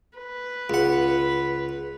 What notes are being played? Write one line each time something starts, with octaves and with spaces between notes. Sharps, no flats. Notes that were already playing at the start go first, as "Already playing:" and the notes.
B4
C#2 F#5